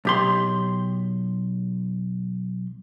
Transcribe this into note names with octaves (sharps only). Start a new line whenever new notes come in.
B1 G4 C6